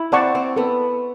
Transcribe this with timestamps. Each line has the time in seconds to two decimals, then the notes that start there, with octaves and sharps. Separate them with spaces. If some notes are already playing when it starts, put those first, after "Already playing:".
Already playing: E4
0.12 C4 D5 F#5 A5 C#6
0.35 C4
0.56 B3 A4